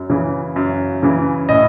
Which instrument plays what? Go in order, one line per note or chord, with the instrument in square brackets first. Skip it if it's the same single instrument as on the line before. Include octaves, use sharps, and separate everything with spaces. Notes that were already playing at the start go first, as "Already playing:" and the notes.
Already playing: [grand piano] F#2
C#3 E3
F#2
C#3 E3
A2 D#5